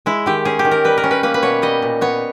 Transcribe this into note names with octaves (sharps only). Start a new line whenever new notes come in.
G#3 E4
D#3 G4
C#4 G#4
G4
D#3
A#4
G3 B4
A#4
C#4
B4
A#3 B4
B4
B2 C#5
G3 D#5
A#2
B3 C#5